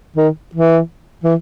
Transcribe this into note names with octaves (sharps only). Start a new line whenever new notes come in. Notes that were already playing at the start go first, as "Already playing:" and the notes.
D#3
E3
E3